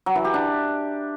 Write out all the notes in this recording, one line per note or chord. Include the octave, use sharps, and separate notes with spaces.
F#3
E3
G4
D4